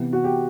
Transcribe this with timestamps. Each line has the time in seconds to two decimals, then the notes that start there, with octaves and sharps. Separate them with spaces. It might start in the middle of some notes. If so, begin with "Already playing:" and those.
Already playing: C3 E3 B3
0.13 F#4
0.24 G4